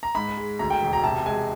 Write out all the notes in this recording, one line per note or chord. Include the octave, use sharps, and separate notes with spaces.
A#5
G#2 B5
G#3
D2 A#5
G5
E1
A#5
C3 A5
G#3 G#5